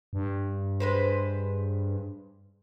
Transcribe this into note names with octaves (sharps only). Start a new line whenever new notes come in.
G2
G#3 B4 C5